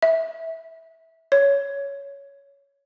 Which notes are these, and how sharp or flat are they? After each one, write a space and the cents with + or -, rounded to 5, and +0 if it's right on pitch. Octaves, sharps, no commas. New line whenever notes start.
E5 -15
C#5 +10